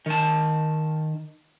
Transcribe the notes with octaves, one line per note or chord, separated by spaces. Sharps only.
D#3 A5